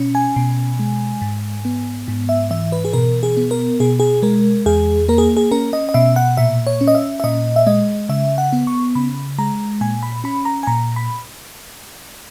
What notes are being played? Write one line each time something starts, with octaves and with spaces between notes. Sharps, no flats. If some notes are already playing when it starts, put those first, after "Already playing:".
Already playing: B2 C#4
G#5
B2
G#3
G#2
B3
G#2
E5
E3 E5
B4
G#4
B2 A#4
G#4
B3
A#4
B2 G#4
G#4
G#3 A#4
E2 G#4
A#3 A#4
G#4
G#4
C#4 A#4
D#5
D#5
B2 E5
F#5
A#2 E5
C#5
C#4
D#5
E5
E5
A#2 D#5
E5
G#3 D#5
C#3 E5
F#5
B3
C#6
C#3 B5
G#3 A#5
A#2 G#5
B5
C#4 B5
A#5
G#5
A#2 A#5
B5